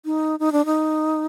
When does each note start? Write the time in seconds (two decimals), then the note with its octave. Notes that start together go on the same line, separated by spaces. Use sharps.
0.05 D#4
0.40 D#4
0.52 D4
0.65 D#4